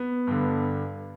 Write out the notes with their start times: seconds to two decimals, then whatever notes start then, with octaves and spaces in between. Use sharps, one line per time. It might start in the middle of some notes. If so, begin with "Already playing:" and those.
Already playing: B3
0.27 G2 D3